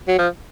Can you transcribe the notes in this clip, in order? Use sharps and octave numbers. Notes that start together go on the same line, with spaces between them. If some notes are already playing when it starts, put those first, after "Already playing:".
F#3
F3